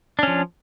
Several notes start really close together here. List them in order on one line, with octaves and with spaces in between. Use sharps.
D4 C#4 F3